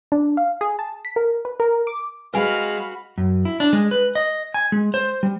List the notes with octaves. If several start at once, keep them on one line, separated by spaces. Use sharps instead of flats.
D4
F5
G#4
A5
B6
A#4
B4
A#4
D6
G#3 C4 F#4 G#4 B4 F5 G#5 B5
F#2
E4
D4
G#3
B4
D#5
G#5
G#3
C5
G3